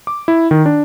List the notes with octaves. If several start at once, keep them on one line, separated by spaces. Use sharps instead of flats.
D6
E4
D#3
D4